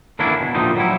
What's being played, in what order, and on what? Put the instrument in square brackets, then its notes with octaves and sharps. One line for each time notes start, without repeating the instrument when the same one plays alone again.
[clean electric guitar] D3 E3 A#3 C#4 D4 E4
B2
A#2 D3 F3 G3 A3 D#4
F#3 G3 E4